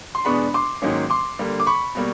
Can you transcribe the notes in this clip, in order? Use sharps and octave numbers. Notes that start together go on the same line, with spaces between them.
C6
E2 B2 G#3 B3 D4 B5 C#6
C6 D6
G#2 D#3 F#3 A#3 C#4
C6 D6
D3 G3 A#3
D6
B5 C#6
B2 G3 A#3